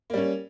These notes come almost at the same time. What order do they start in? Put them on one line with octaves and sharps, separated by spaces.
A#3 G3 C#4